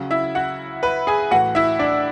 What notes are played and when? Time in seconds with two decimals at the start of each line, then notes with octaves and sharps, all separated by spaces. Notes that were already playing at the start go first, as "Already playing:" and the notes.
Already playing: C#3 F#3
0.11 E4 E5
0.35 F#4 F#5
0.83 B4 B5
1.07 G#4 G#5
1.31 A2 E3 F#4 F#5
1.55 E4 E5
1.79 D4 D5